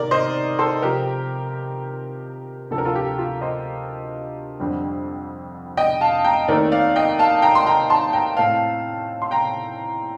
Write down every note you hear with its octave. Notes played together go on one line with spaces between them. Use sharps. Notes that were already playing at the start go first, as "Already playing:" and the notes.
Already playing: C3 D#3 A#4 D5
C5 D#5
A4 C5
C3 F3 C4 G4 A#4
D2 C3 F3 A4
A#4
F4 A4
G4
F4
C5 D#5
F2 D3 G3 C4
D#5 G5
F5 A5
G5 A#5
D#2 D#3 A3 C4 A#4 D5
D5 F5
D#5 G5
F5 A5
G5 A#5
C6
G5 A#5
A5 C6
G5 A#5
A2 A3 C4 F5 A5
C6
G5 A#5